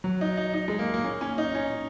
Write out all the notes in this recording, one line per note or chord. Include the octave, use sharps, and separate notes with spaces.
F#3
D#4
D#4
D#4
G#3
A#3
A#3
C#4
C#4
D#4
C#4